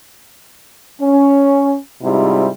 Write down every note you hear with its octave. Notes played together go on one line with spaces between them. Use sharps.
C#4
G#2 C3 G3 E4 F4